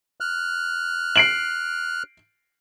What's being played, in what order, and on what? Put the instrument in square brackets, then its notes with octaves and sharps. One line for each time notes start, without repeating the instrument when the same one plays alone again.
[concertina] F6 F#6
[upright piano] C7 D7 F#7